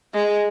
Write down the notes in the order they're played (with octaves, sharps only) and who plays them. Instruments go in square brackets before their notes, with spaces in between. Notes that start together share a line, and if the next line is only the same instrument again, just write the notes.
[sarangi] G#3